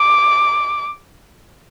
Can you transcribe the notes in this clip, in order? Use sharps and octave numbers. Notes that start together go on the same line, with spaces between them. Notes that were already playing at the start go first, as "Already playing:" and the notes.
Already playing: D6